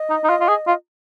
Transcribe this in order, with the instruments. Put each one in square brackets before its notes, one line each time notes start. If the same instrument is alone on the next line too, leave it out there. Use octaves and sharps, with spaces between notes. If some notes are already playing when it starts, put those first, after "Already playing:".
Already playing: [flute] D#5
[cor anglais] D#4
D#4
F4
F4
G#4
F4